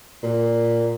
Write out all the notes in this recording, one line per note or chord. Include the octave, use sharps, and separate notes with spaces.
A#2